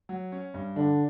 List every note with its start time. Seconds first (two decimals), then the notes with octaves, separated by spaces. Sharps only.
0.09 F#3
0.32 C#4
0.54 G2
0.76 D3 D4